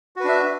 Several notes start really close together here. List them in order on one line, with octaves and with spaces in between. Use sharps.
F#4 B4 D4 E5